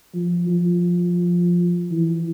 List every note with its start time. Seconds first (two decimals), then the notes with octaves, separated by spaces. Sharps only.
0.15 F3
0.49 F3
1.91 E3